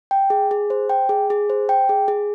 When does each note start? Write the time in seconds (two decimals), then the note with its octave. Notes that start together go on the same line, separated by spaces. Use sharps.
0.11 G5
0.30 G#4
0.51 G#4
0.70 C5
0.89 G5
1.09 G#4
1.30 G#4
1.50 C5
1.69 G5
1.89 G#4
2.08 G#4